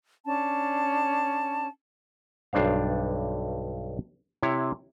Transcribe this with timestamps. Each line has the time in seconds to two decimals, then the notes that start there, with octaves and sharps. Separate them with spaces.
0.25 C#4 D4 A5
2.53 B1 G2 D4 C5 F5
4.43 C3 E4 C#5